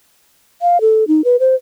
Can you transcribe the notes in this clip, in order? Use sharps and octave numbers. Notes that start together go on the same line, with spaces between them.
F5
A4
D#4
B4
C5